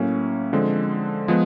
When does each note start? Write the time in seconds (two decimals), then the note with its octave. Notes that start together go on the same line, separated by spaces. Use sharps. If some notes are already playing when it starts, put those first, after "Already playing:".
Already playing: A2 F#3 A#3 C#4
0.53 D3 F3 G#3 C4
1.28 F3 G#3 B3